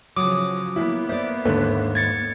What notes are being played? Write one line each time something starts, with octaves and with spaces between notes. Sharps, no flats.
C#3 F3 F#3 D6 D#6
A#3 B3 E4
C5 D5 E5
D#2 G#2 D3 A3 B4
G#6 A6 C#7